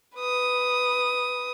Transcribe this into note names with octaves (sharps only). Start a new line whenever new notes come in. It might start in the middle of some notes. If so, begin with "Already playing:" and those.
B4 D#6